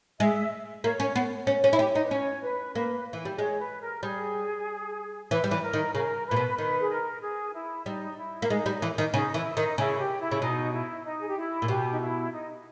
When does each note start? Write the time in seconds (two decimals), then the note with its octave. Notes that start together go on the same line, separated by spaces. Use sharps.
0.20 G#3 E5
0.84 A#3 C#5
1.00 C#4
1.16 B3
1.47 C#4
1.64 C#4
1.73 E4
1.79 G4
1.95 D#4
2.04 B4
2.11 C#4 C#5
2.43 B4
2.75 A#3 B4
3.13 E3
3.25 G3
3.38 G#3 C#5
3.60 B4
3.82 A#4
4.03 G3 G#4
5.31 E3 B4
5.44 G3
5.51 E3
5.63 A#4
5.73 D#3
5.94 C#3 A#4
6.27 A#2 B4
6.36 B2
6.58 D#3 B4
6.80 G#4
6.90 A#4
7.22 G#4
7.54 E4
7.85 G3 D#4
8.17 E4
8.42 A#3
8.49 G#3 D#4
8.66 G3
8.82 E3
8.98 D#3
9.14 C#3 D#4
9.34 E3 E4
9.56 D#3 D#4
9.77 C#3 E4
9.99 G4
10.20 E4
10.31 C#3
10.41 B2 D#4
10.74 E4
11.05 D#4
11.20 G#4
11.28 G4
11.37 E4
11.62 A#2
11.68 B2 G4
11.91 D#4
12.00 E4
12.33 D#4